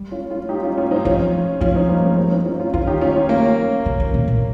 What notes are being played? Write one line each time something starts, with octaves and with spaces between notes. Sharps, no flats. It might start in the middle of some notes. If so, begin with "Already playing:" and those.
Already playing: G3
C#4 F4
C#4 F4
D#4 G4
C#4 F4
C#4 F4
C4 D#4
F3 C#4 F4
F3 C#4 F4
C4 D#4
G3 A#3
G#3 C4
A#3 C#4
C4 D#4
C#4 F4
C#4 F4
D#3 C#4 F4
D#4 G4
C#4 F4
C#4 F4
A#3 C#4
C#3
D#3
A#2
A#2